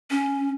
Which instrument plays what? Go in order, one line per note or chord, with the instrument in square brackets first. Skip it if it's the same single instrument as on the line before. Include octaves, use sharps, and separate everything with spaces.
[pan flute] C#4